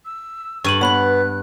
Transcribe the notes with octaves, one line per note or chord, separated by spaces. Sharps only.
E6
G2 C#6 D#7 F#7
B3 C#5 B5 F#6 F#7